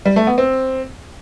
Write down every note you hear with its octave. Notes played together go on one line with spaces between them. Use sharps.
G3
A3
B3
C4